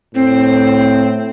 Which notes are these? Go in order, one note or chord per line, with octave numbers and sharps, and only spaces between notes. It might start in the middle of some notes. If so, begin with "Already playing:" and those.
A2 C4